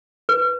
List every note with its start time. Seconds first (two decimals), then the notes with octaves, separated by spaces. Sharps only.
0.29 B4